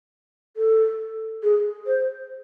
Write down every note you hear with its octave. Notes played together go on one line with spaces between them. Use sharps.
A4
G#4
C5